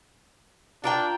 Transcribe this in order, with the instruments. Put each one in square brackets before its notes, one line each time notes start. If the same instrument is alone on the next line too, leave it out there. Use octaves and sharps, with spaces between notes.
[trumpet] D4 [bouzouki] F4 A#4 G5